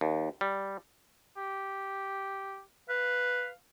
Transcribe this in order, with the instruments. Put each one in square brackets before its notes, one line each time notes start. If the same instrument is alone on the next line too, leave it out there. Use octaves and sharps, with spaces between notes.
[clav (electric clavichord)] D#2
G3
[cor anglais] G4
[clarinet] B4 [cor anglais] F5